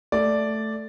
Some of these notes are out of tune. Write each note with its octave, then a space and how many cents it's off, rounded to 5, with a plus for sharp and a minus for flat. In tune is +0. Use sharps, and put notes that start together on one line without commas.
A3 +0 D5 +0